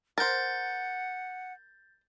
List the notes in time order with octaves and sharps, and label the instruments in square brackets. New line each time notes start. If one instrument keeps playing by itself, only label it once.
[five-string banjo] A#4 C5 [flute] F#5 [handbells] G6 A6